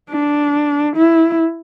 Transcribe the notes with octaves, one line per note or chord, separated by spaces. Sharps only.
D4
E4